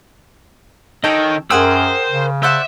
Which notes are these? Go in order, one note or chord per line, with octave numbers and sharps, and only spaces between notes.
D#3 A4 C#5 D#5 G5
F#2 G#4 A#4 C5 F#5 G5 D#6 E6
C#3
C5 D5 E5 F#5